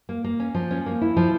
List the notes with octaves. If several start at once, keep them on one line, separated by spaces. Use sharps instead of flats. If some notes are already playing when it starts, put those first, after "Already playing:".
A#3
A#3
C#4
F3
C#4
A#3
E4
F3